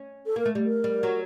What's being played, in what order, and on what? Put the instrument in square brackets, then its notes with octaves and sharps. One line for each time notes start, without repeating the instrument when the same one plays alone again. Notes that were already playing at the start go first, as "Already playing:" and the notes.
Already playing: [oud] C#4
[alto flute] A4
[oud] A#3 [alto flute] A#4
[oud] A3
G3
[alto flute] A#4
[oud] G3
F#3